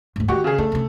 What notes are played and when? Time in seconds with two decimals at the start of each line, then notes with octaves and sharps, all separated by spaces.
0.16 D#2 G#2
0.28 D#3 F#4 G4 C#6
0.44 C#3 G#4
0.58 A3 D4
0.72 C3 C#4